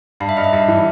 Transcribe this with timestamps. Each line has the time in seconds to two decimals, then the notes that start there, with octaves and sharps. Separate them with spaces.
0.20 G2 F5
0.29 E5
0.37 G2 D#5
0.44 E5
0.53 G2
0.68 E3